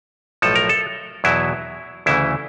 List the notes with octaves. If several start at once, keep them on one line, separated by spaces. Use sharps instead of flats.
B1 A2 F3 A4
A#4
A4
E2 B2 F#3 E4
D2 C#3 E3 E4